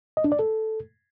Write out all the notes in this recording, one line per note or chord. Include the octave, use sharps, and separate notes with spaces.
D#5
D4
D5
A4